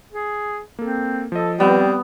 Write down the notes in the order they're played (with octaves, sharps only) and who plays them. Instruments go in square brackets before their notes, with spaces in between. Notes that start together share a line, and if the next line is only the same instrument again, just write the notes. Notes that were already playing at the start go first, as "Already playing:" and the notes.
[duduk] G#4
[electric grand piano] A#3 A4 [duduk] C4
[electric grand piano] F3 D#5 [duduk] A4
[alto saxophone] G3 [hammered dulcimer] B3 [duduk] C4